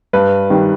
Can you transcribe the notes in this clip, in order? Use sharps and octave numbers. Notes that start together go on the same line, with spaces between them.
G2 B4
D#3 G3